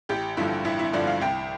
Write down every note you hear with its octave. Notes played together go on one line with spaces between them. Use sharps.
A1 G4
G2 D3 F3 E4
A1 E4
E4
G2 D3 F3 D5
F5
C2 G5